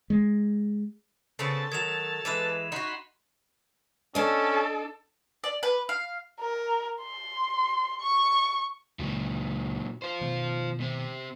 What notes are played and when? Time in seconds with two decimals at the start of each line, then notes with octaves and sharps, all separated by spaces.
0.10 G#3
1.39 C#3 B3 C4 A4 A5
1.72 D#3 F#3 G#6 E7 F7
2.25 E3 G#3 B4 D#7 E7
2.72 D#4 F#4 F#5 B5 C6
4.15 C#4 D4 A4 D#5
5.44 D5
5.63 B4
5.89 F5
6.40 A#4
7.02 C6
8.01 C#6
8.99 C#2 A#2 F#3
10.02 F4 C5
10.21 B2 D#3 A3
10.80 C3 C4